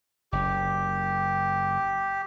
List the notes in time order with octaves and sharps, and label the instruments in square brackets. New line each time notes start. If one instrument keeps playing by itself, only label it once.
[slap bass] F#1 [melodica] G4